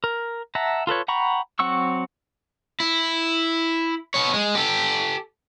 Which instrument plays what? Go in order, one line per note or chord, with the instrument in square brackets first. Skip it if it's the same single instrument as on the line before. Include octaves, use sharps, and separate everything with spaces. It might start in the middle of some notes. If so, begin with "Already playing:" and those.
[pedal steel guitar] A#4
E5 F#5 A5 A#5
F4 A4 B4 C#5
F#5 G5 A#5 B5 C#6
F#3 C4 F#5 C#6 E6
[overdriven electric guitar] E4
B3 C#5
G#3
G4 A4